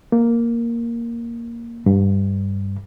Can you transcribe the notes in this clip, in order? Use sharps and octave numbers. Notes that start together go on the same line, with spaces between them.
A#3
G2